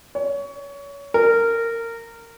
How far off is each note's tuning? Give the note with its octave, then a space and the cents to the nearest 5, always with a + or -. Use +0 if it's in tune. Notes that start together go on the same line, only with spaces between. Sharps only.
C#5 +25
A#4 -20